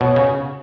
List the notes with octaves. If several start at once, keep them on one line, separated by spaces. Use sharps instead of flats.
B2 C#5
C#5
C#3